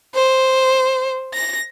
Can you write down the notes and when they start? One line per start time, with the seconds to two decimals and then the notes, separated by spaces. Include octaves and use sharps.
0.15 C5
1.34 A#6